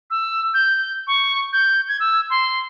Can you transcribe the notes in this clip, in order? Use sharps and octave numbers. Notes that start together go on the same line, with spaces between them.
E6
G6
C#6
G6
G#6
E6
C6